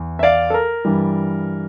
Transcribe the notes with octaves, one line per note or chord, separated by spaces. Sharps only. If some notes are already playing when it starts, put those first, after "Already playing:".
Already playing: E2 E3
E5
D5 F5
A4
A#4
G2 E3 G3